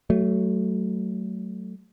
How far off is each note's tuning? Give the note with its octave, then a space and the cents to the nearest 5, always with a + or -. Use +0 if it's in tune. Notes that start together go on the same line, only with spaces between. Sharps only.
F#3 +25 A3 +0